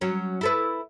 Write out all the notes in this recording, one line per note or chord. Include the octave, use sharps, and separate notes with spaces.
F#3 C#4
E4 A4 B4